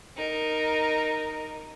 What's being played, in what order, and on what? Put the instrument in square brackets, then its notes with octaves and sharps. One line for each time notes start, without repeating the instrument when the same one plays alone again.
[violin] D#4 A#4